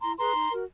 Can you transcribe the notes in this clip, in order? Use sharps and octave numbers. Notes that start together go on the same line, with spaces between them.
E4 A#5 C6
G#4 B4 A#5 C6
D#4
F#4 A#4